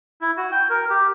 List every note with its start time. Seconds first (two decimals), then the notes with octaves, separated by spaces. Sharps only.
0.21 E4
0.37 F#4
0.52 G5
0.70 A#4
0.90 G4